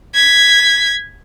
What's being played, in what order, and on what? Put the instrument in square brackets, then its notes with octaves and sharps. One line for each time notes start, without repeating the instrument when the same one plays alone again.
[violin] G#6 B6